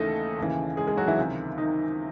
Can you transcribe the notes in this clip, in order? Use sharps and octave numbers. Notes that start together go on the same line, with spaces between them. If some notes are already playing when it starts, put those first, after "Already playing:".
Already playing: D#2 C#3 E3 A3 D#4 A4 D#5
D#2 C#3 E3
G#3 G#4
G#3 G#4
F#3 F#4
E3 E4
C#2 C3 D#3
D#3 D#4